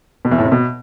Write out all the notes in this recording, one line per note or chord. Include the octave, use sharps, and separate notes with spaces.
B2
E2
A2
C3
B2